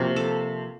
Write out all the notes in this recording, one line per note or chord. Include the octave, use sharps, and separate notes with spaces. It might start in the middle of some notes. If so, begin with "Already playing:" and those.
Already playing: C3 F3 A#3 F#4
A4